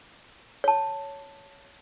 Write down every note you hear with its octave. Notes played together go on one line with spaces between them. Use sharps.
C#5 A5